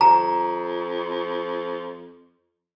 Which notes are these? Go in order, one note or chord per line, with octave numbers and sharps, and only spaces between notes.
F2 A#5